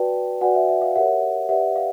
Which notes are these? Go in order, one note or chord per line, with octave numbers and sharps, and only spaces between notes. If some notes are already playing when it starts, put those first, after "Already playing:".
Already playing: F#4 B4 D5 G5 A5
F#4 B4 D5 F#5 G#5
E5
E5
F5
G4 A#4 C#5 E5 F#5
G4 B4 D5 E5 F#5
F5